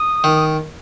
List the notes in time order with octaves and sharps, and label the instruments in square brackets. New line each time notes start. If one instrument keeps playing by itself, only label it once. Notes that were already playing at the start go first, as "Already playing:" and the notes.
Already playing: [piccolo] D#6
[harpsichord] D#3